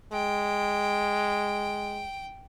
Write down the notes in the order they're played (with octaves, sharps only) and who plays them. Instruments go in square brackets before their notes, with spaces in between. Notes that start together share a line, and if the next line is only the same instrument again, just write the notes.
[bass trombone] G#3 [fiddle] G5